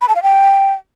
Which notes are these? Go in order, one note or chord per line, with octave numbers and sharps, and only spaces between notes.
B5
A5
F5
G5